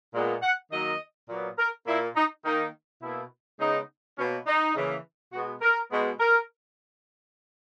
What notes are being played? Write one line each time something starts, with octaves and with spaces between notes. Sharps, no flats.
A#2 G#3 B3
F#5
D#3 F#3 A#3 D#5
A#2 F#3 B3
A#4
A#2 A#3 E4
D#4
D#3 A#3 D#4
B2 A#3 E4
C#3 G#3 B3 D#4
B2 F#3 A#3 C#4
D#4
C#3 E3 A#3
B2 G#3 B3 F#4
A#4
B2 G#3 B3
A#4